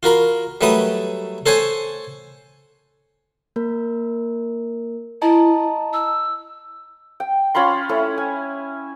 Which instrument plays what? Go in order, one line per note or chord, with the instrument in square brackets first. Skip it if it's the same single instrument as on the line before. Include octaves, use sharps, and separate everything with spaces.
[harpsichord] F4 F#4 A#4 B5
F#3 G3 A3 B4 B5 D#6
A4 C5 C#5 F#5 G#5
[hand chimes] A#3 A#4
[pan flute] E4 [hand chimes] D#5 A5 A#5
[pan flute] E6
[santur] G5
C#4 F4 B5 C6
A3 C#4 E4
G#5